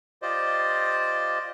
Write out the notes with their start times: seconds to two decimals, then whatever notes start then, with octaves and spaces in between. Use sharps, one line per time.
0.22 F4 G4 C5 D5 D#5